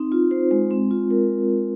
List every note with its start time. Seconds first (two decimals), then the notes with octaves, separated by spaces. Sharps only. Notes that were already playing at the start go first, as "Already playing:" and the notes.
Already playing: C4 D#4
0.12 F4
0.31 C5
0.51 G#3
0.71 C4
0.91 F4
1.11 A#4